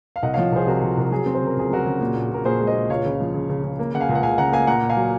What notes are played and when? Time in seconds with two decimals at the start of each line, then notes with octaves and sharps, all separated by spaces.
0.16 F5
0.23 C2 D#5 F#5
0.34 F3 C#5 F5
0.52 C2 G#4 C5
0.67 C3 F#4 A#4
0.82 F3
0.97 C2 A#4
1.12 F#3 G#4
1.26 C4
1.35 C5
1.41 C#3
1.47 A#4
1.57 C#2 G#4
1.71 F#3 F#4 A#4
1.86 C#3
2.00 A#2
2.15 A#1
2.30 A#1 A#4
2.45 A#1 G#4 C5
2.60 G#3
2.67 C5 D#5
2.75 A#1
2.90 C#2 C#5 F5
3.05 C#3
3.20 F3
3.34 C#3
3.49 C#3
3.64 C#3
3.79 A#3
3.94 C#3 F#5
4.00 F5 G#5
4.09 C#2
4.15 F#5
4.23 C#2 F5 G#5
4.38 C#3 F#5 A#5
4.52 A#3 F5 G#5
4.67 A#2 F#5 A#5
4.82 A#2
4.89 F5 G#5
4.97 F#3